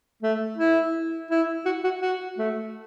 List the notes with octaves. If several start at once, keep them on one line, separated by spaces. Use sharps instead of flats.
A3
E4
E4
F#4
F#4
F#4
A3